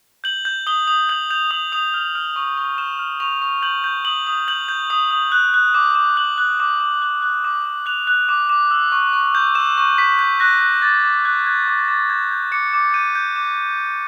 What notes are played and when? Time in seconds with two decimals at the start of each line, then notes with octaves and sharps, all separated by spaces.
0.24 G6 F#7
0.45 G6
0.67 D#6 G7
0.87 D#6
1.09 G6 F#7
1.30 G6 F7
1.51 D#6 F#7
1.72 D#6 F7
1.94 F6
2.15 F6
2.36 C#6
2.57 C#6
2.78 F6 E7
2.99 F6
3.20 C#6 F7
3.42 C#6
3.62 G6 F#7
3.84 G6
4.05 D#6 F#7
4.27 D#6
4.48 G6 F#7
4.69 G6
4.90 D#6
5.11 D#6
5.32 F#6
5.54 F#6
5.74 D6
5.95 D6
6.17 F#6 F#7
6.38 F#6
6.60 D6
6.80 D6
7.02 F#6
7.22 F#6
7.44 D6
7.65 D6
7.86 F#6 F7
8.07 F#6
8.29 D6
8.49 D6
8.71 E6
8.92 C#6
9.13 C#6
9.35 G6
9.55 E6 E7
9.77 C#6
9.98 C#6 B6
10.19 G6
10.40 F#6 A#6
10.62 F#6
10.82 D6 A6
11.04 D6
11.25 F#6 G#6
11.46 F#6 G#6
11.68 D6
11.88 D6 A6
12.09 G6 G#6
12.31 G6
12.52 D6 C#7
12.74 D6
12.94 G6 D#7
13.15 G6
13.36 D6